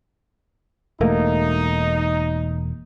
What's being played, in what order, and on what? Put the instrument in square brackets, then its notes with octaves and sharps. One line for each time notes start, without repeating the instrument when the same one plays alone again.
[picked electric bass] E1 A3 A#3 [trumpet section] D#4